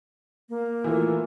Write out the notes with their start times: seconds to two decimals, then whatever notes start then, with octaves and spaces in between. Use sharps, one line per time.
0.49 A#3
0.84 E3 A3 F4